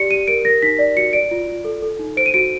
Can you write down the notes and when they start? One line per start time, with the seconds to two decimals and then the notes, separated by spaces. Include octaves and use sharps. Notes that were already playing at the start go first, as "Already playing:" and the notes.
Already playing: G4 D5 C#7
0.10 G4 D#7
0.28 A#4 D7
0.45 A#4 A#6
0.62 D#4 B6
0.79 D5
0.96 F#4 C#7
1.13 D5 D7
1.31 F4
1.47 F4
1.65 A4
1.82 A4
1.99 D#4
2.17 C5 D7
2.26 D#7
2.34 F#4 D7